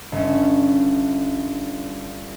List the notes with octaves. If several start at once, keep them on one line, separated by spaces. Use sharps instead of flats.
G1 C#4